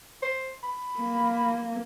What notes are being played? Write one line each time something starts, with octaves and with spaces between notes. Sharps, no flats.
C5
B5
A#3